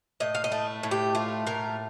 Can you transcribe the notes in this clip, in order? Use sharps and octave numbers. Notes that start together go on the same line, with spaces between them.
A2 D#5
F5
D#5
A3
A2
G4
A3 F4
A2 A#4